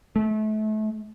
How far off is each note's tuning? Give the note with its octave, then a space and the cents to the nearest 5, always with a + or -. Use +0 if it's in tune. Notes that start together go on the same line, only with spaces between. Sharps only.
A3 -35